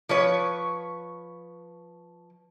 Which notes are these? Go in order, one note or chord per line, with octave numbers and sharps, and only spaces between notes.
F3 B4 C#5